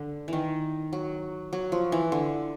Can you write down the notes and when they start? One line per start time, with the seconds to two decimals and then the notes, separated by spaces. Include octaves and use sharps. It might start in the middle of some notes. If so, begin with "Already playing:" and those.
Already playing: D3
0.28 D#3 E3
0.93 F#3
1.53 F#3
1.72 F3
1.92 E3
2.12 D3